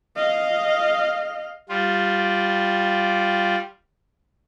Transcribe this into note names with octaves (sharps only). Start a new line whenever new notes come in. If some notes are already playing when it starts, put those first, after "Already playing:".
D#5 F5
G3 F4